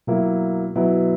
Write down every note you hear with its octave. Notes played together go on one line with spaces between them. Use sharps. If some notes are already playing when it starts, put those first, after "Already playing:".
B2 F#3 A#3 E4
B2 F#3 B3 E4